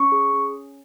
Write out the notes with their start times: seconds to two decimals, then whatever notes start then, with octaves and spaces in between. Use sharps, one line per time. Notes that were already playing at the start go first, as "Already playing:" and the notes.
Already playing: C#4 C#6
0.12 G#4
0.33 C#4